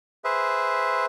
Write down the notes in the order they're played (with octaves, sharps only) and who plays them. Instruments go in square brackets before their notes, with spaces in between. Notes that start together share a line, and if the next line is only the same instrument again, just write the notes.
[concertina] G#4 B4 C5 E5